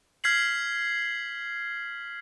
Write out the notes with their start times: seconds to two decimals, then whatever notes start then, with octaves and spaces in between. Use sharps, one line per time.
0.24 F6 G#6 B6 C7 F#7